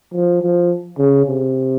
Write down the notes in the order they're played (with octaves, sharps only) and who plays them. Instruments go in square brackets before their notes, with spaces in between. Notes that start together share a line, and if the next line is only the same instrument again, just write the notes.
[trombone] F3
F3
C#3
C3